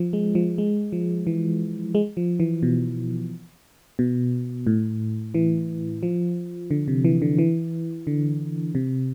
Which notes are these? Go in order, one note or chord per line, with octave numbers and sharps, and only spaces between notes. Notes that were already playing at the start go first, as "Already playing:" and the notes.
Already playing: F3
G#3
F3
G#3
F3
E3
G#3
F3
E3
B2
B2
A2
E3
F3
D3
C3
E3
D3
E3
D3
C3